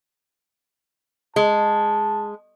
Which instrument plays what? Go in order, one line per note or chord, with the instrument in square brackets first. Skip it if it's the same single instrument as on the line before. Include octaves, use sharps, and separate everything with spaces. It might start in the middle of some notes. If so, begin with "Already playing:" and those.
[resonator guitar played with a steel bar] G#3 [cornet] A5